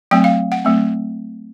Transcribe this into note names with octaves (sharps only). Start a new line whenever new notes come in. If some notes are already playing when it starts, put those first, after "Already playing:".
F#3 A3 C4 G5
F5
F#5
F#3 A3 C4